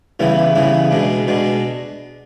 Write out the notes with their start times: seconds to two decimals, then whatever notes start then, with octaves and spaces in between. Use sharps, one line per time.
0.20 C#3 E3 G3 B3 E4
0.55 C#3 E3 G3 B3 E4
0.91 B2 G#3 B3 D4
1.27 B2 G#3 B3 D4